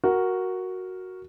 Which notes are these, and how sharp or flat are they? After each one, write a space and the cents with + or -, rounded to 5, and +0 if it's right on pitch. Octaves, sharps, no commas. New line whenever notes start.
F#4 +0 A#4 +0